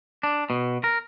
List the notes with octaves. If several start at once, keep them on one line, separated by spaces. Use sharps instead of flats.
D4
B2
A#4